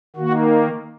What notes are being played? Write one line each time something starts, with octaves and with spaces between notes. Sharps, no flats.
D#3 A#3 F#4